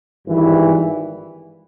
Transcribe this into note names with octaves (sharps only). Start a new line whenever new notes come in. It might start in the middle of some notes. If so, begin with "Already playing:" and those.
G#1 G2 E3